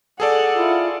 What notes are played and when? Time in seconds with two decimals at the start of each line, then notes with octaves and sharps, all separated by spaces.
0.20 G#4 A4 D5 F#5
0.56 E4 F4